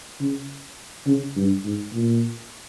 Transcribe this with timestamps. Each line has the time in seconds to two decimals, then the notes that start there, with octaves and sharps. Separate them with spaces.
0.21 C#3
1.07 C#3
1.36 G2
1.65 G#2
1.94 A#2